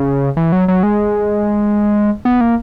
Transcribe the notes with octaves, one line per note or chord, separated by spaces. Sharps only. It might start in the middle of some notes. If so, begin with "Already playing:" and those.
Already playing: C#3
E3
F#3
F#3
G#3
B3
A#3